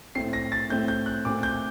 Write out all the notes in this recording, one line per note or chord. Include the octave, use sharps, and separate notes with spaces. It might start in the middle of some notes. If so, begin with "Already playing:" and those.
A2 A3 C4 C7
A#6
A6
A2 A3 C4 G6
G6
F#6
A#2 A3 C4 D6
G6